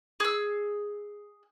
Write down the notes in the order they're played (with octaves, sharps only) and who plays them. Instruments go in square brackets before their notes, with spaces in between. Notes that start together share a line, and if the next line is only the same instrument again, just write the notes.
[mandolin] G#4 E6